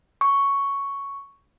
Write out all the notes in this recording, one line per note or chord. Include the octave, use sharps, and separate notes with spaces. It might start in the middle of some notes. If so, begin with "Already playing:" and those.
C#6